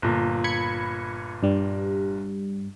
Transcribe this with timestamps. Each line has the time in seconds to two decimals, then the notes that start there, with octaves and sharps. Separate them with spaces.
0.02 G1 A#2
0.44 B5 G#6 C#7
1.43 G2 G3